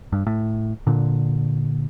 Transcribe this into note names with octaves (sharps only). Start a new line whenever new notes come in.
G2
A2
A#2 D3